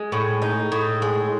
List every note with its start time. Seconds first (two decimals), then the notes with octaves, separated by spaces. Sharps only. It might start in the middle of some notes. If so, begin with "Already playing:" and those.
Already playing: G#3
0.12 A2
0.42 D#4
0.72 A2
1.02 G#3